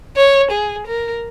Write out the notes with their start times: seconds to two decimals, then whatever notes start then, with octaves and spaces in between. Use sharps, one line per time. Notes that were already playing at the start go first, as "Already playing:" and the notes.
0.16 C#5
0.51 G#4
0.87 A#4